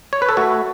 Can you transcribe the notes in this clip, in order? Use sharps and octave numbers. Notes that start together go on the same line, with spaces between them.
C#5
B4
A4
A3 F#4